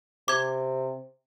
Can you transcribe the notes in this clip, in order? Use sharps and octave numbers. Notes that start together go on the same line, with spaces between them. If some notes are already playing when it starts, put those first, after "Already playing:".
C3 D6 G#6